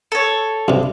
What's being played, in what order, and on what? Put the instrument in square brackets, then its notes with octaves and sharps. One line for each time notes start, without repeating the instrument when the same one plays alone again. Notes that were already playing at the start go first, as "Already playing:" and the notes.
[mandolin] A4 C#5
[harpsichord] G2 C3